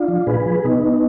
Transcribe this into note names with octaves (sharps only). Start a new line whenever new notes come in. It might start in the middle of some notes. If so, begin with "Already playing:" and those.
Already playing: D4 F4
F3
A#2 G#4 B4
F3
B2 B3 D#4